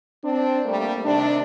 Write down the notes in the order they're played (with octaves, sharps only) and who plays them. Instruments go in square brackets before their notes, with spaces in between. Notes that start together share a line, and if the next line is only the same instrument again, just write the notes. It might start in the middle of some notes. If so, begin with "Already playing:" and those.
[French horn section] C4 D4
G3 A3 A#3
C3 D#3 A3 D4